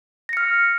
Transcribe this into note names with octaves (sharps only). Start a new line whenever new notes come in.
F6 A#6 C#7